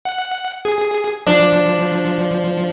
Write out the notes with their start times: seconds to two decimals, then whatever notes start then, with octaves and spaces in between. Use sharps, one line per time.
0.05 F#5
0.65 G#4
1.27 F3 D4